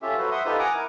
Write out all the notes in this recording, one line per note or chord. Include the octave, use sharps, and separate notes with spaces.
C#4 F4 G4 A4 E5
F#3 F#4 A4 B4 C5
C5 E5 F#5 C6 D#6
D#4 F4 G4 A4 B4 C5
F#5 G#5 A#5 D6 D#6
E4 A#4